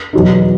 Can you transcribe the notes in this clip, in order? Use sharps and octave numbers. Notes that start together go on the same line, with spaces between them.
E2 B2 F#3 B3 D#4